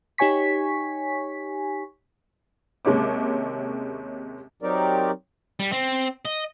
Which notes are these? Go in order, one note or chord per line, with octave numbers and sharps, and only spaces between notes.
D#4 G4 C#5 G#5 C#6 B6
D#2 C3 G#3 C#4 D6
F#3 C4 D#4 G4 A#4 D5
G3
C4
D#5